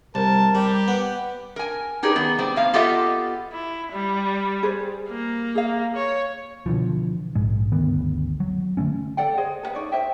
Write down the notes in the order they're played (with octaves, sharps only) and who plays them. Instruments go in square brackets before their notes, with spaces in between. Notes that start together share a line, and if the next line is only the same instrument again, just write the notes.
[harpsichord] C2 [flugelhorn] A#4 [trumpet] A5
[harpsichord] G3 [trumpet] G4
[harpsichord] B3 [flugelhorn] F#5
[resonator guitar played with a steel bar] A#4 G#5
D#4 G4 G#4 A#4 B4 D5
D#3 B3
G3 C4
A2 A#3 F5
B3 F4 G4 A4 D#5 E5
[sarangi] E4
G3
[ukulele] G#4 B4 C5
[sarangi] A#3
[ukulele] G#4 F5
[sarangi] C#5
[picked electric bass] B2 D3 E3 F3
A#1 G#2 G#3
G1 D2 D#3 B3
F#3
D3 E3 A3 C#4
[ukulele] A4 D5 F#5 G5
G#4 C5 D#5
A4 B4 F#5
D#4 C#5 D5
C5 D#5 E5 G5